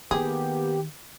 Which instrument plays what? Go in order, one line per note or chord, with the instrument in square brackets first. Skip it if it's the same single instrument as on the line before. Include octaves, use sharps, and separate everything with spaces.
[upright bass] D#3 [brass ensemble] A#3 B3 [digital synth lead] G4 [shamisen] G#4